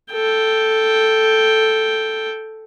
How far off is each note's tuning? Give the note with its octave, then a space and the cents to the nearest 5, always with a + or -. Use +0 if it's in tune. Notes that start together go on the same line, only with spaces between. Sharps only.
A4 +0 G5 +0